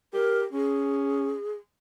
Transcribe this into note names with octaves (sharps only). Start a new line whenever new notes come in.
G4 A#4
C#4 G#4